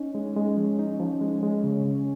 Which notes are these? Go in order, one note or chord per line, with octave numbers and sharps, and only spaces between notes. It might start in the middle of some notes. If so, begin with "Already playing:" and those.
Already playing: C#4 D#4
G#3
G#3
F3
D#4
F3
G#3
G#3
C#3
C#3